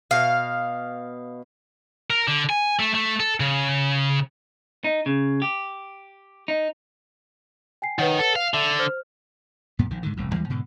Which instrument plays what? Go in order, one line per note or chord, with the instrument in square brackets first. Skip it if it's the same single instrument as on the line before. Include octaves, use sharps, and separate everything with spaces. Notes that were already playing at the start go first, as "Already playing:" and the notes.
[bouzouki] B2 F5
[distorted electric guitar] A#4
D3
G#5
A3
A3
A4
C#3
[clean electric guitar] D#4
C#3
G4
D#4
[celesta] G5 G#5 C7
[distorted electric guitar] D#3 [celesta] B4 C#5 F#5
[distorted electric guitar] A4
F5
[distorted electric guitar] D3 [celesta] E5
[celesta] C5 F6
[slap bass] F#2 A#2 B3
A#1 D#3
G#2 D3 D#3
E1 C2 A2
D#2 E3 G3 G#3
G#2 B2 D3